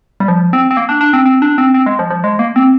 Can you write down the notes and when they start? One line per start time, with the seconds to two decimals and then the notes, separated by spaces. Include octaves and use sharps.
0.20 G3
0.28 F3
0.53 C4
0.71 C4
0.77 A#3
0.89 D4
1.01 D4
1.13 C4
1.26 C4
1.42 D4
1.58 C4
1.74 C4
1.86 G#3
1.99 F3
2.10 F3
2.24 G#3
2.39 A#3
2.56 C4